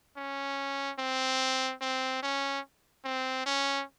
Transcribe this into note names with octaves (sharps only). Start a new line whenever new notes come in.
C#4
C4
C4
C#4
C4
C#4